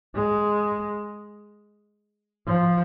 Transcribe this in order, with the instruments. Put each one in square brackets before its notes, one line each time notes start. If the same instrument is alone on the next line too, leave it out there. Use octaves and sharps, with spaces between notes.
[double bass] G#3
F3